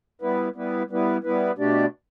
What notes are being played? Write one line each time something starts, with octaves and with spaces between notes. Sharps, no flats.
G3 B3 E4 B4
G3 B3 E4 B4
G3 B3 E4 B4
G3 B3 E4 B4
B2 A3 D4 G4 D5